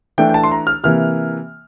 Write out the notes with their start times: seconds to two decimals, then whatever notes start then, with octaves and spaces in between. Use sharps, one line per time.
0.18 E3 A3 D4 G5
0.29 G5
0.34 A5
0.44 C6
0.52 A#5
0.67 F6
0.83 C3 E3 A#3 F6